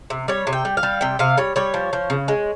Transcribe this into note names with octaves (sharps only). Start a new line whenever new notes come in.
C3
G3 C#5
C3
G5
G3
F5
G3
C3 G5
C3 F5
G3 C#5
G3 C#5
F3
F3
C#3
G#3